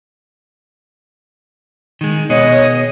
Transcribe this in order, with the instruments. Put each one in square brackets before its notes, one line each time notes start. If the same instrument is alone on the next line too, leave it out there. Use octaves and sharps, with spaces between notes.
[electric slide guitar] D#3 G#3
[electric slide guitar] B2 B3 G#4 [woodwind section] C#5 D#5